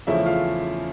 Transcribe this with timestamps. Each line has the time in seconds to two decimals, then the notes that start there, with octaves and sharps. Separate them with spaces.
0.07 E2 C#3 F3 A3 C#4 E4 E5
0.26 F4 F5